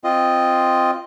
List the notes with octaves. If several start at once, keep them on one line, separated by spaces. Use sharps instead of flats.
C4 F4 D#5